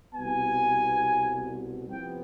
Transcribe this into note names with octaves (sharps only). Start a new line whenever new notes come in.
C2 B2 B3 G#5
C2 C3 F3 B3 G5